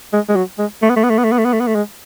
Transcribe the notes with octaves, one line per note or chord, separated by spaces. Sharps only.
G#3
G#3
F#3
G#3
A3
B3
A3
B3
A3
B3
A3
B3
A3
B3
A3
B3
A3
G#3